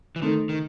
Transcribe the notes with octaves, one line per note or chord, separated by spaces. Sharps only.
E3
D#3 A3 C4 D#4 A4
D#3